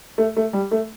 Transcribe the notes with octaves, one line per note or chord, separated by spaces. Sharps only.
A3
A3
G3
A3